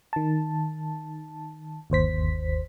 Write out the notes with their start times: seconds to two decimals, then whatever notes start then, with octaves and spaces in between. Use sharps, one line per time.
0.13 D#3 A5
1.90 G1 D#2 C5 B6